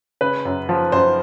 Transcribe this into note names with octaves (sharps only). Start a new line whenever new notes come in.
C#3 B4
F#2
F3
F#2 C5